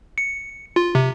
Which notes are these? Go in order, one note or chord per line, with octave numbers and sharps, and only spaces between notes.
C#7
F4
C3